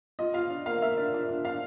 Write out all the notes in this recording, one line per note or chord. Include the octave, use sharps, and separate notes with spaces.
F4 D#5
F4 F5
D4
A#3 F5
A#3 E5
D4
D4
D4
D4 F5